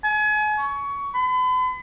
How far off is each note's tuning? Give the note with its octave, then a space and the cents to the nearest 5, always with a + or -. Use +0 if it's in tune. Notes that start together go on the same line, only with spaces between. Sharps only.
G#5 +35
C#6 +20
B5 +40